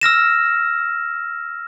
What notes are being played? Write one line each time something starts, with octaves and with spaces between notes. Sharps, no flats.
E6 F6 A#6 E7